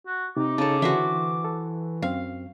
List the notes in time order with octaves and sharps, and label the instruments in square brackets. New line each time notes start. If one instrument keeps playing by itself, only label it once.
[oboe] F#4
[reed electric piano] C3 [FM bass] D#4 [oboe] D6
[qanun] C#3 A4 [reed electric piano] C#5 A5
[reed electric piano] D3 [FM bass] E3 [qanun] F#4 C5 E5
[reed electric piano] A4
[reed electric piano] F#2 C4 [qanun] F5